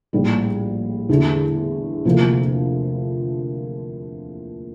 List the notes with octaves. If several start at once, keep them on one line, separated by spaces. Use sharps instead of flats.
A#1 A2 G3
E2 D3 A3
D2 C3 F3 A#3 E4